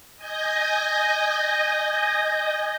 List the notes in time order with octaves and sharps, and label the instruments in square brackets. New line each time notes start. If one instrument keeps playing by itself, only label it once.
[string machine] D#5 G#5 G6 A#6